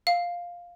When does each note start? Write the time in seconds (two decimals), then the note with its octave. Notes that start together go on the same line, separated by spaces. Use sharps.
0.07 F5